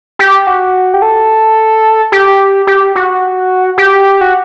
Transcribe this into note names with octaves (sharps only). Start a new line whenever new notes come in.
G4
F#4
G4
A4
G4
G4
F#4
G4
F#4